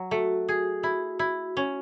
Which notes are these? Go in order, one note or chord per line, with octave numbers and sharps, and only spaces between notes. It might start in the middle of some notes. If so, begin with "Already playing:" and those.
Already playing: F#3
A3 F#4
G#4
E4
E4
C#4